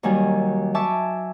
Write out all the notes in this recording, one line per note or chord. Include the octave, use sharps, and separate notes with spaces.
D#2 D#3 F#3 G3 G#5
E5 G#5 A5 C#6 D6 E6